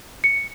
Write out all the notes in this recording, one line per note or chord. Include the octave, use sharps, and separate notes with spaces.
C#7